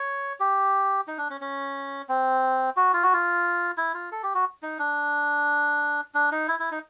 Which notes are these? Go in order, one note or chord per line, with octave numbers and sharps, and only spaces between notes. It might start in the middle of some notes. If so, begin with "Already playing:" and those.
Already playing: C#5
G4
D#4
D4
C#4
C#4
C4
F#4
F4
F#4
F4
E4
F4
A4
G4
F#4
D#4
D4
D4
D#4
E4
E4
D#4